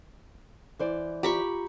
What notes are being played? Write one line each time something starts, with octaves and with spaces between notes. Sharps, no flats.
E3 C5 D5
F4 G4 A#5 B5 C#6